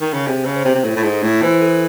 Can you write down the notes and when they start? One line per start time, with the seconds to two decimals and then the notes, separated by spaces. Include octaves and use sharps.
0.01 D#3
0.13 C#3
0.27 C3 G#4
0.45 C#3
0.56 C5
0.65 C3
0.75 C3
0.84 A2 A4
0.96 A2
1.03 G#2
1.23 A2
1.42 E3 C5
1.61 A4